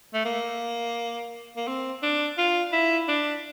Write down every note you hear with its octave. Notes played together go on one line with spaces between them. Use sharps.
A3
A#3
A#3
C4
D4
F4
E4
D4